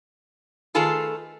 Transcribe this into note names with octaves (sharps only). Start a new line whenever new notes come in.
D#3 A3 F4 G#4 A4 B4